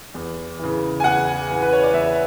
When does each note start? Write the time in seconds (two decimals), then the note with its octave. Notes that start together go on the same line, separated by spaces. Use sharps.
0.14 E2
0.59 C#3 E3
1.00 G#5
1.04 E2 F#5
1.49 C#3 E3
1.62 B4
1.73 C#5
1.83 D5
1.93 E2 E5